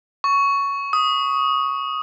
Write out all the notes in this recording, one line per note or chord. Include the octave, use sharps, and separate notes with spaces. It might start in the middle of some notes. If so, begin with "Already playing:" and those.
C#6
D#6